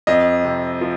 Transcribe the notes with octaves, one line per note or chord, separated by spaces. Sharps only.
F2 D#5
C3
F3